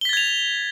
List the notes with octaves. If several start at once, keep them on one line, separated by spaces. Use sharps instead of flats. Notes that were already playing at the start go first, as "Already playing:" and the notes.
G#6 A6 B6 F7 G7